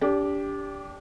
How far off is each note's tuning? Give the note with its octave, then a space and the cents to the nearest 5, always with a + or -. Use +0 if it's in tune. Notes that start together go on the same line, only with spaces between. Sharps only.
D4 -30 G4 +0